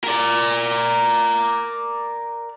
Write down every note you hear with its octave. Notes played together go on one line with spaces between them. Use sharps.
A#4 D5